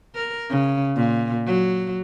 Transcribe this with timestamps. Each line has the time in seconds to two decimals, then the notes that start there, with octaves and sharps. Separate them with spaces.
0.15 A#4
0.50 C#3
0.96 A#2
1.47 F#3